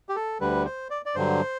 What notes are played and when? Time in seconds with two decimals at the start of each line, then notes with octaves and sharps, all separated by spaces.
0.09 G4
0.16 A4
0.40 D2 D3 G3 B4
0.65 C5
0.90 D5
1.06 D5
1.15 G2 D3 F#3 C5